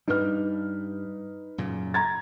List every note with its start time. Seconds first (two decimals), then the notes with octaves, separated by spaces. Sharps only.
0.08 G2 G3 D#4 B4 F6
1.58 F#2 A#2 C#3
1.94 A#5 G#6 A6